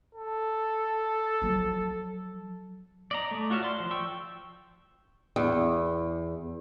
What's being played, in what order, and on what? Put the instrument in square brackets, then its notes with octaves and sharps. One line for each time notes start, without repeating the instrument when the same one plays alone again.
[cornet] A4
[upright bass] F3 F#3
[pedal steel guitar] D5 D#5 A#5
A3
F4 F#4 C#5 E5 F6
D5 C6
F3
G5 C#6 E6
[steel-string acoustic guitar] E2